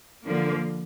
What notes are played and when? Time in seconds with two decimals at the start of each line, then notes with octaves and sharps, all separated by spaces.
0.24 D3 F3 A#3